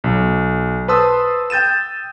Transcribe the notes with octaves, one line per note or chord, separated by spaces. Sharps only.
B1
B4 C5 A5 C6 D#6 E6
G5 G6 A6 D#7 E7